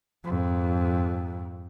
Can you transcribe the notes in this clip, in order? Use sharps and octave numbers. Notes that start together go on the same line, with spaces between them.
F2 G#2